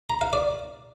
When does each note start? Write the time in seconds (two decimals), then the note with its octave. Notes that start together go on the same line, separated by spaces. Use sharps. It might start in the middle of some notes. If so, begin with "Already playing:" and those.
0.10 A#5
0.21 F5
0.33 D5